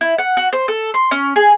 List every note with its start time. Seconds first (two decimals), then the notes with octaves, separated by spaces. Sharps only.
0.01 E4
0.18 F#5
0.37 F#4
0.53 C5
0.68 A4
0.94 C6
1.11 C#4
1.36 G#4